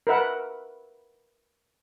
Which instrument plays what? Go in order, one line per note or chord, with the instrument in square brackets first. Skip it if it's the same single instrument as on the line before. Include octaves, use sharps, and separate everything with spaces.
[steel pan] A#4 B4 E5 F#5